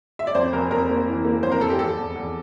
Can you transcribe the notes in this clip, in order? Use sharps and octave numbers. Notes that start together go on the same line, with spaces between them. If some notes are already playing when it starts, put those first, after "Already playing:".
E5
D5
F2 C5
F1 A#4
F1 A#4
A#3
E3
A#3
F2 C5
A#4
F1 A4
G4
E2 A4
E2
E2